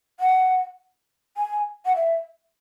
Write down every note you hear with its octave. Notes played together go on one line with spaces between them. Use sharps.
F#5
G#5
F#5
E5